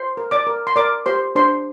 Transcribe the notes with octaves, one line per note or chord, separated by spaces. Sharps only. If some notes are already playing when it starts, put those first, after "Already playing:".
Already playing: C5 C6
A#4
D5 D6
A#4
C6
A#4 D5 D6
G4 C5 C6
D4 C5 C6